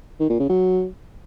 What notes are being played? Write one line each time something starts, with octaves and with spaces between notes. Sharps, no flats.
D#3
A#2
C#3
F#3